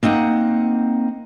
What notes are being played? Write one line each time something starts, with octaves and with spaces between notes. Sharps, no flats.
A#3 C4 D#4 F#5